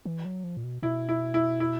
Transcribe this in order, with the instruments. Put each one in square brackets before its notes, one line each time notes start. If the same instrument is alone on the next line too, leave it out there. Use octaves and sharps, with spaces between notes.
[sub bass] E3
F#3
F3
A#2
B2
[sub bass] B2 [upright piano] E4
[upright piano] E4
E4
E4